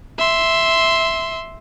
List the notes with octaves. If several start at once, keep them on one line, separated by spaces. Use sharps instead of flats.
E5 C6